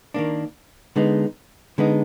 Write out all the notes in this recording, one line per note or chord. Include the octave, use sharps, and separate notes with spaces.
D#3 A#3 D4
D3 G#3 B3 D#4
D3 G#3 B3 D#4